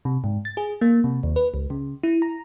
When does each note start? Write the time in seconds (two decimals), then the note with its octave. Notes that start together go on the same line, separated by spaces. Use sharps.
0.05 C3
0.24 G#2
0.45 A6
0.57 G#4
0.81 A#3
1.04 C3
1.23 D#2
1.36 B4
1.54 C#2
1.70 C#3
2.03 E4
2.22 A#5